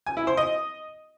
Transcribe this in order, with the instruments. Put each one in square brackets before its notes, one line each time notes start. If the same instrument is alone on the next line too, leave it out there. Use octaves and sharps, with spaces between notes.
[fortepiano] G#5
E4
C5
D#5